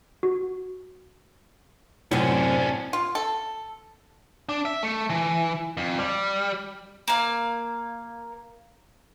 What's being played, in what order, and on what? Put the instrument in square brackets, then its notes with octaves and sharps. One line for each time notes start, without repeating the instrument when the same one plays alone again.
[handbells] F#4
[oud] F#2 C3 [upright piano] A2 [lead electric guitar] C#4 D4 [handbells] C#5
[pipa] F4
A4
[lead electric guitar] D4
E5
A3
E3
F2
G3
[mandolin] A#3 F5